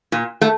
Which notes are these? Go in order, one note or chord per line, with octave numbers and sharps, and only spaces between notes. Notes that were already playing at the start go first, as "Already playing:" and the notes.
A#2
A3